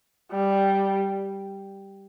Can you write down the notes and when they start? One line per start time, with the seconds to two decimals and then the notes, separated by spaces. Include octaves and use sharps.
0.31 G3